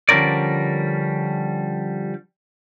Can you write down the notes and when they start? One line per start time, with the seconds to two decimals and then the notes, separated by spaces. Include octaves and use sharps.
0.09 D3 F3 G3 C#4 A#4 D5